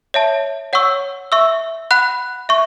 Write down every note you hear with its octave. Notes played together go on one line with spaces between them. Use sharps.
C#5 E5 A5
C#5 F#5 C#6 E6
E5 C#6 E6
F#5 B5 F#6
E5 C#6